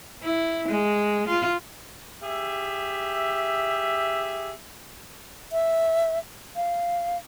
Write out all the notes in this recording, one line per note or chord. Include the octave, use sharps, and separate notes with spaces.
E4
G#3
F4
G4 G#4 E5
E5
F5